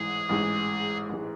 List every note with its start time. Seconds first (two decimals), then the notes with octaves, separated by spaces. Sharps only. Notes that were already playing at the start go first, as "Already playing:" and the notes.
Already playing: A1 G#2 E3 G#3 G#4
0.29 A1 G#2 E3 G#3
1.09 A1 E3 G#3